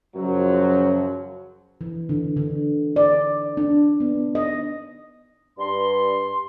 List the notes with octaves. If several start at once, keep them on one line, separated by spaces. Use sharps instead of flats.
F#2 C#3 F3 F#3
E3
D3
D3
D5
D4
B3
D#5
G2 C6